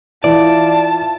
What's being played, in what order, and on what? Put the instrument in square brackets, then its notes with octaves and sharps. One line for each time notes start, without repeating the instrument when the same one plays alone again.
[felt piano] E3 [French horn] F4 [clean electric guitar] D5 [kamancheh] A5